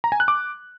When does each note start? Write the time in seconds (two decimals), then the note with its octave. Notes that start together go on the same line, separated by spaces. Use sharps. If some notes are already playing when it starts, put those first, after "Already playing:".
0.04 A#5
0.12 G#5
0.20 F#6
0.28 D6